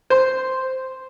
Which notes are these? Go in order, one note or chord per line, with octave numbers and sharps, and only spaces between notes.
C5